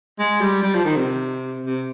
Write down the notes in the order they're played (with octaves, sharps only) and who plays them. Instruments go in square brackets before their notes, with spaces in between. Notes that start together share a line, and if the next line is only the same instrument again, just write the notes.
[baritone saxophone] G#3
G3
G3
F3
D#3
C3
C3